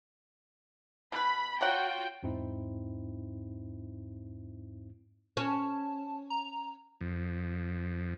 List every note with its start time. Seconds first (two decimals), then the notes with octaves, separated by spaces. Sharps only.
1.12 B2 B4 B5
1.61 F4 F#4 A#4 C#5 F#5 G5
2.23 E2 G#2 C4 D#4 E4
5.37 C#4 A5
6.30 A#5
7.01 F2